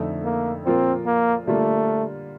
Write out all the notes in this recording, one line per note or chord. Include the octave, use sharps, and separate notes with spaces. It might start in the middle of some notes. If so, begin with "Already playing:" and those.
Already playing: F2 D3 A3 D#4 A4
A#3
A#2 F3 A#3 C4 F4 A#4
A#3
D3 G3 A3 A#3 F4